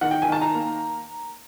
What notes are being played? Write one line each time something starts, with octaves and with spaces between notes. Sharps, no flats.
D#3 F#5
G5
G#5
D#3 A5
A#5
A#3